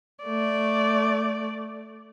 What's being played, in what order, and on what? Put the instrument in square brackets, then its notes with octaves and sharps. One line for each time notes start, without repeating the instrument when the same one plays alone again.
[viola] A3 D5